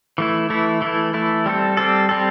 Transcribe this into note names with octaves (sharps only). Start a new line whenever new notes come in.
E3 A3 E4
E3 A3 E4
E3 A3 E4
E3 A3 E4
G3 C4 A4
G3 C4 A4
G3 C4 A4